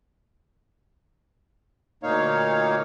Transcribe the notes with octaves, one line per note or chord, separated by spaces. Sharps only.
D2 A#2 A#3 D#4 C#5 F5